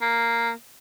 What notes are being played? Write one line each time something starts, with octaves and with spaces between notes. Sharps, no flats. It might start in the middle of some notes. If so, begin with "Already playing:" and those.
A#3